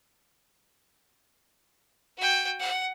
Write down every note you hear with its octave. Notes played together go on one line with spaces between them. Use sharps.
F#4 G5
F#5